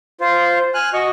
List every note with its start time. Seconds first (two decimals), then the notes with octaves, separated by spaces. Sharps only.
0.21 F4 C5
0.74 G#5 F6 F#6
0.93 F#4 D#5 C#6